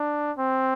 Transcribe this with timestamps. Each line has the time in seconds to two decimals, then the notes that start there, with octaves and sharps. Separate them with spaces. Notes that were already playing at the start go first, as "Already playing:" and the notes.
Already playing: D4
0.38 C4